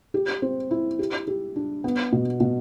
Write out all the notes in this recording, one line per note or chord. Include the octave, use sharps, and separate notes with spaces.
G4
C4
E4
G4
G4
D4
B3
B2
B2